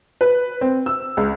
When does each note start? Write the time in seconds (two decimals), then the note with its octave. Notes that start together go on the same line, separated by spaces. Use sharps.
0.21 B4
0.61 C4
0.86 E6
1.17 C#2